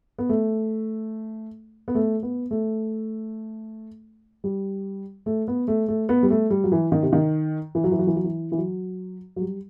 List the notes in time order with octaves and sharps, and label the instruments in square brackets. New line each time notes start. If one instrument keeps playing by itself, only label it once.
[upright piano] B3
A3
B3
A3
B3
A3
G3
A3
B3
A3
A3
B3
G3
A3
G3
F#3
E3
D#3
C3
D#3
E3
F#3
E3
F#3
E3
F#3
E3
E3
F#3
F#3
G3